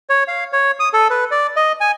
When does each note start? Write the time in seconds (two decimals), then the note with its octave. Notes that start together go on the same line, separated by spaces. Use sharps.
0.10 C#5
0.28 F5
0.53 C#5
0.80 D#6
0.93 A4
1.10 B4
1.31 D5
1.56 D#5
1.81 G#5